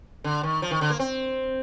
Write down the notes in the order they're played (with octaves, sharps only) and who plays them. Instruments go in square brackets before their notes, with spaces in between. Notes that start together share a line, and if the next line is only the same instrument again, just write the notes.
[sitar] D3
D#3
F3
D#3
D3
A#3
C4